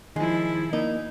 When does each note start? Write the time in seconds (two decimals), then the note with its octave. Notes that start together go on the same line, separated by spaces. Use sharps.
0.16 D#3 F3 G#3 E4
0.73 A#3 D#4